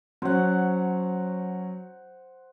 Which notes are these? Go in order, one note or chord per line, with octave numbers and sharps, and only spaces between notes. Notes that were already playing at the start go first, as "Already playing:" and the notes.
F#3 C#4 C5 F#5